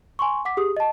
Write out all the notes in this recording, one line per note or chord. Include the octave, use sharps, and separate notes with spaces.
G#5 C6 C#6
F#5 D6 B6
G4 G#4 D#6
D#5 A5